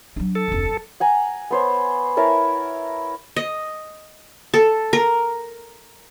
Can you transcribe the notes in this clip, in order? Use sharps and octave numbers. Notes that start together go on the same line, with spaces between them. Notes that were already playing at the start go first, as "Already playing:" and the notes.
F#3 D4
A4
F1 D2
F#2
F#5 G#5 A#5
B3 C5 C#5
E4 A#4 C#5 A5
D#5
A4
A#4